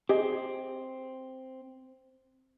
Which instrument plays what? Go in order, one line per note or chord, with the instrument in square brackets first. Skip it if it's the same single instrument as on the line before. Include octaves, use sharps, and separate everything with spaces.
[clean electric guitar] C4 [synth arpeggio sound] G4 G#4 D#5